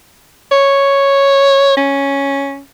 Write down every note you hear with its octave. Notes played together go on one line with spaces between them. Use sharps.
C#5
C#4